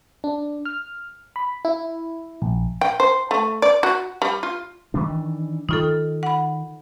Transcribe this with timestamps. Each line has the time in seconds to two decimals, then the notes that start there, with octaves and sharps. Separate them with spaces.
0.24 D4
0.65 F6
1.36 B5
1.65 E4
2.42 A#1
2.81 G5
3.00 C5
3.31 A3
3.62 D5
3.83 F#4
4.22 G3
4.43 F4
4.94 D#3 E3 D4
5.69 D#3 D#4 F4 A4
6.23 F#5 B5